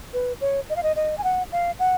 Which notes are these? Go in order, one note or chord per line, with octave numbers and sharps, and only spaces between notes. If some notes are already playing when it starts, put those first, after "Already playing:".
B4
C#5
D#5
F5
D#5
D#5
G#5
F#5
F5
F#5